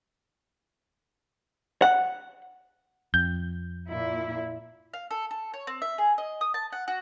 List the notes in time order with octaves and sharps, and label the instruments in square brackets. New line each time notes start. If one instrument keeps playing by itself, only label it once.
[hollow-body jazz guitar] F#5
[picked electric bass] F2 [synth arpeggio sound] G6
[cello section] A#2 E4
[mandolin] F5
A4
A4
C#5
C4
E5
G#4
D#5
D#6
A5
F#5
F#4